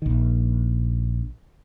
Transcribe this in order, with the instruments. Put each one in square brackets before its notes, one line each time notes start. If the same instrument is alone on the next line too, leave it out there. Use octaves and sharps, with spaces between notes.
[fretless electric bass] A#1 D#3